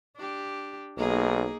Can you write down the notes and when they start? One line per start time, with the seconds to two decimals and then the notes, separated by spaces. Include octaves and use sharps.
0.16 D4 G4
0.97 B1 A#3 D#4 G#4